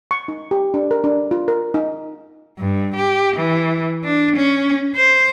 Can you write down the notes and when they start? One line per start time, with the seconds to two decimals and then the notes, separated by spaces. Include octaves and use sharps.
0.11 C#6
0.28 D#4
0.51 G4
0.74 D4
0.91 A#4
1.04 D4
1.31 F4
1.48 A#4
1.74 D#4
2.58 G2
2.96 G4
3.37 E3
4.04 D4
4.36 C#4
4.96 C5